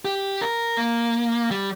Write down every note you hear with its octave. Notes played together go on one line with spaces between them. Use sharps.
G4
A#4
A#3
G3